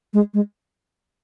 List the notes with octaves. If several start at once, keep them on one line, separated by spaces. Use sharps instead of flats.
G#3
G#3